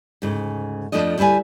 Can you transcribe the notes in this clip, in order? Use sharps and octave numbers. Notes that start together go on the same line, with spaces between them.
D2 G#2 C#3
F2 C3 F3 A3 D4 D#5
D2 G3 E4 B4 G#5